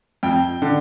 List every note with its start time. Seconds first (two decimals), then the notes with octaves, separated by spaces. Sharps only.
0.23 F2 G5
0.62 D3